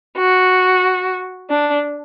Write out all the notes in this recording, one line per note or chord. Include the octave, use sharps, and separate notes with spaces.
F#4
D4